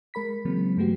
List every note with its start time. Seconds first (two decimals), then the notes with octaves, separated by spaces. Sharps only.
0.14 G#3 A#4 B5 B6
0.45 C#3 E3 F#3 G#3 A#3 C4
0.77 G2 F#3 A3 B3 F#4 G4